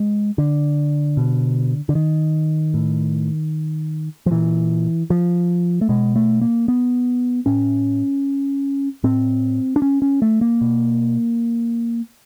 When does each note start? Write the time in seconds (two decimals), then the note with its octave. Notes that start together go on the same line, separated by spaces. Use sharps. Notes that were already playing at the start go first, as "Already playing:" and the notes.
Already playing: G#3
0.38 D3
1.17 B2
1.89 D3
1.95 D#3
2.74 A2
4.26 F3
4.31 A#2 E3
5.10 F3
5.81 A3
5.89 B2 G#3
6.16 A3
6.41 A#3
6.68 B3
7.46 A2 C#4
9.03 A2 C4
9.76 D4
9.82 C#4
10.02 C#4
10.22 A3
10.41 A#3
10.61 B2